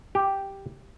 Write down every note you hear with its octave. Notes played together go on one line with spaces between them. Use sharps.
G4